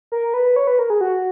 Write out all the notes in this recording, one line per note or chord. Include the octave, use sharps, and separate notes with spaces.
A#4
B4
C#5
B4
A#4
G#4
F#4